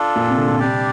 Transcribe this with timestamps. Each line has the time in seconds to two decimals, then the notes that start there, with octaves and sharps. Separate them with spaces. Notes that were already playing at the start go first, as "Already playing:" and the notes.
Already playing: D4 F4 A4
0.16 A#2
0.27 C3
0.37 D3
0.49 A#2
0.59 C3 G3 D4 G4 D5